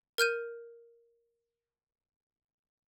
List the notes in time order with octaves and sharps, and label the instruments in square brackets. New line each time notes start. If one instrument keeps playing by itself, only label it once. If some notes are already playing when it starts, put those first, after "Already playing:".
[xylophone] A#4 F6 G6 D#7